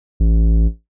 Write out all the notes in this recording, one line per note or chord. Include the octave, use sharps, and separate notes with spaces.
A1